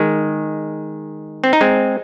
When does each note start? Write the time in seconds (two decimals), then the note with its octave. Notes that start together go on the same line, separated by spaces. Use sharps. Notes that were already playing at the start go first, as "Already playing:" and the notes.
Already playing: D#3 G#3
1.44 C4
1.53 D#4
1.61 G#3 C4